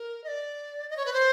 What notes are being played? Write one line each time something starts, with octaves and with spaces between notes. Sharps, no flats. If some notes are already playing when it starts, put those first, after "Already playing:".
Already playing: A#4
D#5
D5
D#5
C#5
B4
C5